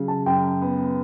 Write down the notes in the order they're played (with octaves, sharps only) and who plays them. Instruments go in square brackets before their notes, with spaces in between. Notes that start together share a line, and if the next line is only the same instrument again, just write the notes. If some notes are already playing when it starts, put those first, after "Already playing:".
Already playing: [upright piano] C#3 F#3
[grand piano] A5
[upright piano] F#2 [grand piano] G5
[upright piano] B3